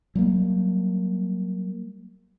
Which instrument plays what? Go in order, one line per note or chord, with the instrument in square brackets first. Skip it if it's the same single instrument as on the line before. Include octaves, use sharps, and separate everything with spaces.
[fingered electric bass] F#3 G3 A#3